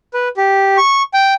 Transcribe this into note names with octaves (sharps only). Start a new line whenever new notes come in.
B4
G4
C#6
G5